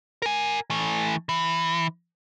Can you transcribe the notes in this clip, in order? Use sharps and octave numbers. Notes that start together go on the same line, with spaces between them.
A#4 G#5
E3 A3
E3